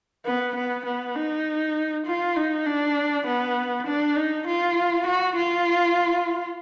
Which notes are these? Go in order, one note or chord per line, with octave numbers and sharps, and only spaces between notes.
B3
B3
B3
D#4
F4
D#4
D4
B3
D4
D#4
F4
F#4
F4